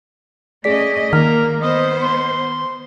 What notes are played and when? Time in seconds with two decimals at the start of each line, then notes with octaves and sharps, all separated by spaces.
0.64 A3 C#4 G#4 D5 D#5 B6
1.13 D#3 A#3 A#4 F6
1.62 B3 C5 D#5
2.03 C6